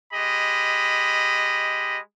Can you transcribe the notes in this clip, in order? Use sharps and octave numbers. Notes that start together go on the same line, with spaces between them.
G#3 G4 D#5 B5